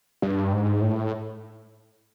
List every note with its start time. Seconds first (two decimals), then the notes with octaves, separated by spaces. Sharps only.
0.22 G2
0.53 G#2
0.82 A2